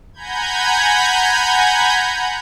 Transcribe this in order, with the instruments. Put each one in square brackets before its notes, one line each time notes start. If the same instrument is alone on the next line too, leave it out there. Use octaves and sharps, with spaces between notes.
[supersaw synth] F#5 G#5 A#5 B5 G6 G#6